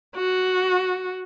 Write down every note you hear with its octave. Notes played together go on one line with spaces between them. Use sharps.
F#4